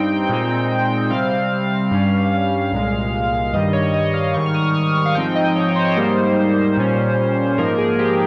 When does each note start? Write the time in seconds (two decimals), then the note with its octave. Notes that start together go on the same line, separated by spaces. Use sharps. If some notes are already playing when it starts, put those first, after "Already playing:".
Already playing: G2 G3 C4 D#4 G5
0.29 A#2 G#3 C4 D#4
1.10 C3 G3 C4 F5
1.91 G2 G3 C#4
2.72 C2 A#2 G#3
3.53 G2 D#3 G3 D#5
3.73 C#5
3.94 D#5
4.14 F5
4.34 G#2 D#3 G3 C#6
4.46 F6
4.54 D#6
4.74 D#6
4.95 C#6
5.06 F5
5.15 G#2 F3 C4 D#4 G5
5.35 D#5
5.56 C#5
5.76 C5
5.85 C#5
5.93 G#2 G3 A#3 D#4 C5
6.77 A#2 G3 C#4
7.58 G#2 F3 A#3 D#4 A#4
7.78 G#4
7.99 G4